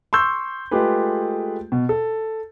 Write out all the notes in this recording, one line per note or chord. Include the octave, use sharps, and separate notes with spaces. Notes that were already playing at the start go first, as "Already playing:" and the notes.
C6 C#6 E6 G6
G#3 A3 F4 G4 G#4 B4
B2
A4